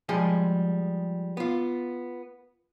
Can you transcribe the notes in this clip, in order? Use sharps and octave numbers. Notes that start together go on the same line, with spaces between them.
F3 G3 G#3 G#4 D#5
B3 F4